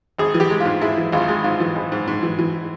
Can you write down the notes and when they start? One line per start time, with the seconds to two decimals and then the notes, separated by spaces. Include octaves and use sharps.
0.18 G#1 G#4
0.34 E3
0.40 G4
0.50 G#3
0.60 G#2 F4
0.81 G#3 E4
0.97 E3
1.12 G#1 F4
1.28 G#3
1.44 G#2 F4
1.60 E3
1.75 G#1
1.92 G#2
2.08 G#2
2.23 E3
2.39 E3